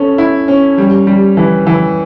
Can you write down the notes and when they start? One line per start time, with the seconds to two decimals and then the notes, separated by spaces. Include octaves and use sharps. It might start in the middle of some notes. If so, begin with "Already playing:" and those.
Already playing: C#4 A4
0.18 E4
0.48 C#4
0.78 G3
1.07 G3
1.37 E3
1.67 E3